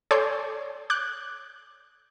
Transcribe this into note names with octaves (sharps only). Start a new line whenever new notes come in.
A4 C#5 D5 G#5 C6 G6
D6 F#6 G6